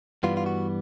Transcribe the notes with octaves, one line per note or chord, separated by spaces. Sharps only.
G2 E3 G3 B3 F4
F4
F#4